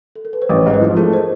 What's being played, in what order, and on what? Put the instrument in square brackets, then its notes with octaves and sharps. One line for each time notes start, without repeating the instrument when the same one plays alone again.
[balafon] A4
A#4
B4
C5
[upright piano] A1 [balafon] B4 C#5
[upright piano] G#2 [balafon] B4
[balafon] A#4 C5
[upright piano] F3
[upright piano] A3 [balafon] G#4 A#4
[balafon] C5